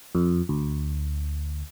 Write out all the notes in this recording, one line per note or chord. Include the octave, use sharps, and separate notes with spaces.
F2
D2